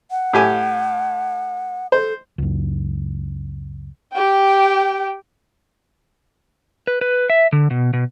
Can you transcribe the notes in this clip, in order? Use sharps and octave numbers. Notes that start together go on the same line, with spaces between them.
F#5
A2 G4 G#5
A4 C5
C#2 F#2
G4 G5
B4
B4
E5
D3
B2
B2